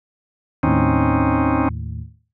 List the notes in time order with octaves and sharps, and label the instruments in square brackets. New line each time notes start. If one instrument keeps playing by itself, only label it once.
[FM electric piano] D#2 A2 [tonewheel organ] C4 C#4 D#4